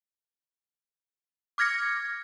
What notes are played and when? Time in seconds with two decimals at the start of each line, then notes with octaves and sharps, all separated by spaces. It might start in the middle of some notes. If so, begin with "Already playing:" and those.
1.58 D6 F6 G#6 A#6 C#7